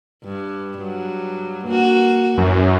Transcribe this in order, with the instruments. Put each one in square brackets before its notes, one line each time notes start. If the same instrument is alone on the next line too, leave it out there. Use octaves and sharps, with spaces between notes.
[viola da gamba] G2
G2 F#3
A#3 F#4
[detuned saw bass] F#2 [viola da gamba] E3